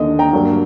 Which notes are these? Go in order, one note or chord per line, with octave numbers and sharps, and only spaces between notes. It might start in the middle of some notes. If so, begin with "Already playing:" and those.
Already playing: D#2 D3 A3 D#5
G5 A#5
G2 F#3 A#3